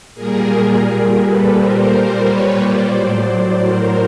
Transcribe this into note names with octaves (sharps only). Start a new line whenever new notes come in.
A#2 G3 G#4 A#4
G#4 A#4
A4 B4
A#4 C5
B4 C#5
C5 D5
A2 F#3
A#4 C5